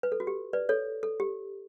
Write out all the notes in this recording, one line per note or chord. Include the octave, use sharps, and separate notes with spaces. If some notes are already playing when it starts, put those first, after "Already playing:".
B4
A4
F#4
G4
B4 D5
A4 C#5
A4
G4